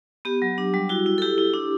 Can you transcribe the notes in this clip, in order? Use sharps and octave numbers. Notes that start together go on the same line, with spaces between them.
B3 G4
F#3
D4
G3
E4 F#4
E4
A4
E4 G4
E4
D4